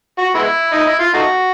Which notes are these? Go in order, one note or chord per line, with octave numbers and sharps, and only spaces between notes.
F#4
G#3 B3 E4
D#4
E4
F4
A3 D#4 F#4